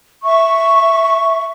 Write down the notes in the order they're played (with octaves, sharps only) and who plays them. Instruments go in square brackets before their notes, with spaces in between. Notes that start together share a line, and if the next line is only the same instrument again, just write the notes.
[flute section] E5 C#6